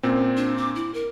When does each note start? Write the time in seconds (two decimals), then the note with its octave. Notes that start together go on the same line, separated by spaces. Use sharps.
0.03 A#2 C4 C#4
0.37 D4
0.57 D6
0.76 E4
0.94 A#4